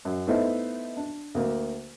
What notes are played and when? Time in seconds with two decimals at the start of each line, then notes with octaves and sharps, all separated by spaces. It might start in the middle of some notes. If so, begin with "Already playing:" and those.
0.05 F#2
0.27 A3 B3 D#4 E4 C5 E5
0.97 D4
1.35 D2 A#3